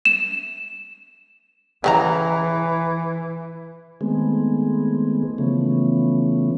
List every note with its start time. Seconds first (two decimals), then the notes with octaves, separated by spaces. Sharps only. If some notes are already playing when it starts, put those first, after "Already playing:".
0.05 E7
1.84 C#3 E3 C4 A#5
4.01 D#3 G#3 A3 B3 C4 G#4
5.38 C#3 E3 F3 A3 B3 C#4